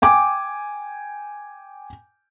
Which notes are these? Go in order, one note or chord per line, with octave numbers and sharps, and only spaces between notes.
G5 G#5 D6